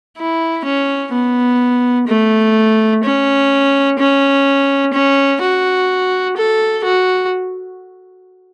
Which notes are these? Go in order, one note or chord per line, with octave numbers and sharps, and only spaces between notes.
E4
C#4
B3
A3
C#4
C#4
C#4
F#4
A4
F#4